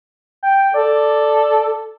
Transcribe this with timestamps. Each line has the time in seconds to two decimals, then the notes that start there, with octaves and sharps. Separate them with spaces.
0.43 G5
0.74 A4 D5